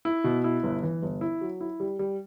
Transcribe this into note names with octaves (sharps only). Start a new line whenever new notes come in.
E4
B2
E4
G1
E3
G1
E4
F#3
E4
G3
G3